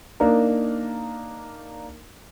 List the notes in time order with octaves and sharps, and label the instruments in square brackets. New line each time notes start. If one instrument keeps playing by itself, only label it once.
[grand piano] A#3 D4 D#4 A#4